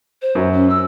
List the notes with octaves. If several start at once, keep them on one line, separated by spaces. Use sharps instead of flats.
C5
F#2
C#4
E6